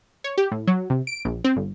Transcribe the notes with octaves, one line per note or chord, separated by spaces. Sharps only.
C#5
G4
A2
F#3
C3
D7
A#1
C4
G1